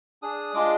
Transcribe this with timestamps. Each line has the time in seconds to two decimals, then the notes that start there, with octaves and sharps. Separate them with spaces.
0.22 D4 G#4 D#6
0.54 G#3 D4 F4 G#4 D6